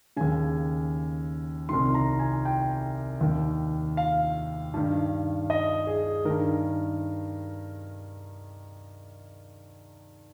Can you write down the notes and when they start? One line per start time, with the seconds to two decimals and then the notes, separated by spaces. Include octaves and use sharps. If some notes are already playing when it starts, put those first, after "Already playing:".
0.16 D#2 C#3 G#5
1.69 C2 C3 D#3 C6
1.94 A#5
2.19 G#5
2.45 G5
3.21 D#2 D#3
3.97 F5
4.74 G2 D#3
5.50 D#5
5.87 G#4
6.25 G2 D#3 A#4